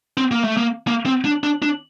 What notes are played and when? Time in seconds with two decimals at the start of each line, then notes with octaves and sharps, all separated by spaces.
0.17 C4
0.31 A#3
0.44 A3
0.57 A#3
0.88 A#3
1.06 C4
1.25 D4
1.43 D4
1.62 D4